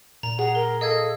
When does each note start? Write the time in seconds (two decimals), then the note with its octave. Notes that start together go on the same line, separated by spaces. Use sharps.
0.23 A#2 A#5
0.39 G#4 F#5 A#5
0.55 A#4 G7
0.81 A4 D#5 F5 D#6 G#6